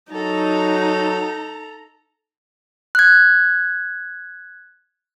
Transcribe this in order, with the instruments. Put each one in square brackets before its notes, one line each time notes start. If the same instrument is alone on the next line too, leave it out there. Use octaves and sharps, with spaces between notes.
[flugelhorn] F#3 [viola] D#4 [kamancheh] A4 A#5
[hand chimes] F#6 G#6